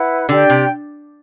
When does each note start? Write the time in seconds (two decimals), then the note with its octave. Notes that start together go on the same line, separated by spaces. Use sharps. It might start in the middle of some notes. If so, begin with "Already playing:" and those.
Already playing: E4 B4 F#5
0.29 D3 G4 D5 G5
0.50 C3